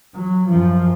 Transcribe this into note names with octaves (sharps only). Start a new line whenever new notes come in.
F#3
F#2 F3